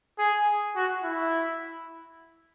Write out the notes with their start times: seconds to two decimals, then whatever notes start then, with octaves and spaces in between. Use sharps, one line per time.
0.19 G#4
0.76 F#4
1.04 E4